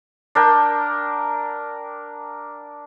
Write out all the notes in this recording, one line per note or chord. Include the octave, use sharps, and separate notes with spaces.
D4 A#4 G5